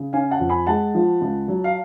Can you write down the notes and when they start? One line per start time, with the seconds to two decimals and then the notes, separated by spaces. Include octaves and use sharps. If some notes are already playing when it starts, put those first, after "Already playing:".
Already playing: C#3
0.13 C#4 F5 G#5
0.31 F#5 A5
0.40 F2
0.49 G#5 B5
0.66 G#3 F#5 A5
0.94 F3
1.22 C#2
1.48 F#3
1.64 F5